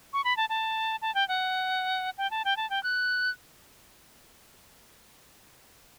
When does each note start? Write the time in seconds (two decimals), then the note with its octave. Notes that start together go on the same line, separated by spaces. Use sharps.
0.13 C#6
0.24 B5
0.37 A5
0.49 A5
1.02 A5
1.15 G5
1.28 F#5
2.18 G5
2.31 A5
2.45 G5
2.57 A5
2.70 G5
2.83 F#6